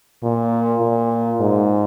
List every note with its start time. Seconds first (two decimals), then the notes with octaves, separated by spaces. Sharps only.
0.23 A#2
0.81 A#2
1.40 G#2